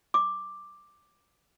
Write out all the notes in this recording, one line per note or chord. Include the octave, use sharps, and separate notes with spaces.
D6